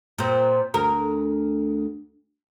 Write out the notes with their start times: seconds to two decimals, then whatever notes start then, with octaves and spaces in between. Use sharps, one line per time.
0.18 A#2 C4
0.74 D2 A#4